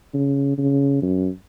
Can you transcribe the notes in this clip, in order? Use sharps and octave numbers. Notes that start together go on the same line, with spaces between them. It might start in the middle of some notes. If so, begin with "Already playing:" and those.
C#3
C#3
F#2